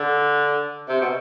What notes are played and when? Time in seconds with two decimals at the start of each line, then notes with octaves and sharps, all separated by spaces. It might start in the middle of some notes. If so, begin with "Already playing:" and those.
Already playing: D3
0.88 C3
1.01 B2